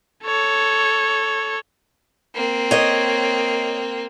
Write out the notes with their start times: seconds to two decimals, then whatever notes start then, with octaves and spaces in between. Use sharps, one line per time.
0.24 A4 C#5
2.35 A#3 C4
2.71 C#5 D#5